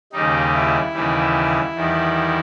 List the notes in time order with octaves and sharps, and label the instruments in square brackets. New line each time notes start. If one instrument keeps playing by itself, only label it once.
[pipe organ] D#2 C#3 G3 D#4
E4
D#2 C#3 E3 G3
E2 D#3 G3